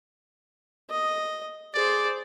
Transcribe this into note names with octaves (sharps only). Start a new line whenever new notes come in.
D#5
G#4 C5 D5